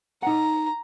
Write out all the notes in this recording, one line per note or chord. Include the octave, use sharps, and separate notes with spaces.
D#4 F#5 A#5